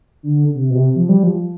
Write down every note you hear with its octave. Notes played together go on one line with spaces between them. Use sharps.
D3
C3
B2
C3
F3
G3
F3